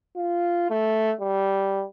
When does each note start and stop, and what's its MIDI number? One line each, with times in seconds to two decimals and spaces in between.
0.16 0.68 65
0.70 1.13 57
1.21 1.84 55